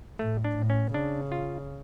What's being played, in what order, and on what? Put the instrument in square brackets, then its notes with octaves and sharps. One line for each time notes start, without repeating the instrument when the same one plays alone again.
[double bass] A2 [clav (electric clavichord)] A3
[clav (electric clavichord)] D4
[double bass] A2
[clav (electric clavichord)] C#4
[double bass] C#3 [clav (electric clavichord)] D4
[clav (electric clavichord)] F4